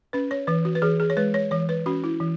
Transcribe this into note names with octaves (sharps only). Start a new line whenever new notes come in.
C#4 B4
C#5
E3 B4
F#4
B4
E3 G#4
G#4
C#5
G#3 B4
C#5
E3 C#5
B4
C#4 F#4
E4
E3